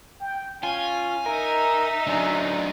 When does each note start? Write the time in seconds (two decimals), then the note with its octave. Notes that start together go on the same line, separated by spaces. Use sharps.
0.21 G5
0.63 C#4 F4 G#5
1.26 D#4 A#4 E5
2.07 D2 F#3 C#4 D4